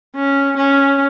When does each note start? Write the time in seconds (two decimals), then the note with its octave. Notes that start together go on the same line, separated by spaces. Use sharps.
0.15 C#4
0.57 C#4